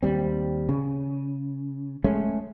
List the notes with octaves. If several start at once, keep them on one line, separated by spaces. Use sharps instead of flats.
D#2 G3 C4
C#3
G#3 A3 C#4